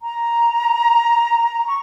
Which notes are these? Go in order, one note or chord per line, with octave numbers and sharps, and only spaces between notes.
A#5
C#6